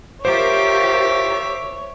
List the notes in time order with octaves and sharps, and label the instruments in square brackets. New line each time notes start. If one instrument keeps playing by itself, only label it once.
[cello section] F4 G4 A#4 [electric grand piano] C5 [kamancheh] C#5 [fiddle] E5 D6